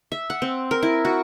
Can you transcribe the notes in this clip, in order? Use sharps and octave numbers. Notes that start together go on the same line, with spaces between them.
E5
F#5
C4
A#4
E4
F#4